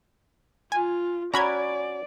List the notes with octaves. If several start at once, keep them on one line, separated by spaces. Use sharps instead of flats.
F4 G#5
C#4 F#4 D5 A#5 B5 G#6